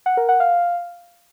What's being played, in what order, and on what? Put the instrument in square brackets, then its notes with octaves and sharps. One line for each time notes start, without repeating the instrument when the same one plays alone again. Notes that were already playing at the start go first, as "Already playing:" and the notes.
[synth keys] F#5
A#4
F#5
F5